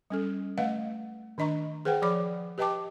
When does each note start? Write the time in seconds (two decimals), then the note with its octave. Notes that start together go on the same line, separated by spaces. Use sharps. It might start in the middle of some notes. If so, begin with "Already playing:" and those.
0.10 G3 C#4 A4
0.58 A3 B4 D#5 F5 F#5
1.38 D#3 D4 D#5 A#5 C#6
1.85 G#4 B4 C5 F#5 G5
2.02 F3 G#4 C#5 D5 B5 D6
2.58 G4 B4 D#5 G5 A5 D6